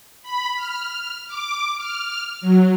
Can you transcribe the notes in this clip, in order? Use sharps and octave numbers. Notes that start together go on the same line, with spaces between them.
B5
F6
D6
F6
F#3